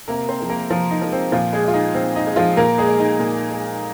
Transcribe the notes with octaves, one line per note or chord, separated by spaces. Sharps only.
C3 A#3 A#4
C4 C5
F3 G#3
A#3 A#4
C3 F3 F4
D#4
F3 G#3
C4
A#2 F3 F4
G#3 G#4
G#3 F4
D#4
A#2 C4
D#4
G#3
F3 F4
A#2 A#3 A#4
G#3 G#4
G#3
D#4
A#2
G#3